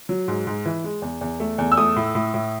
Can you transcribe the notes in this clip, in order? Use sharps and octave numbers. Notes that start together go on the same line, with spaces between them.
F#3
G#2
G#2
E3
G#3
E2
E2
A3
E2
E6
A3 D#6
A2
A2
A2